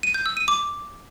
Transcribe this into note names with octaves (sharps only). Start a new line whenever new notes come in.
D#7
G6
E6
D#7
D6